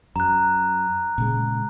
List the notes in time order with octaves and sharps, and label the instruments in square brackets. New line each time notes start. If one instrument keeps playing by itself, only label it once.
[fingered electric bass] F#2 [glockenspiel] A#5 F#6
[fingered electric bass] A#2 C#3 G#3